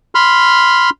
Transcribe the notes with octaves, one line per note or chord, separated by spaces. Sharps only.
B5 C6 F6